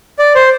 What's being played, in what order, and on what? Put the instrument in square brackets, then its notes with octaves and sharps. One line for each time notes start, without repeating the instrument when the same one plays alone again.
[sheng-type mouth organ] D5
C5